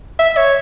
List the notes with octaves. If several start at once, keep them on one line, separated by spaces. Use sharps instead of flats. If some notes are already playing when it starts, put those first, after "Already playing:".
E5
C#5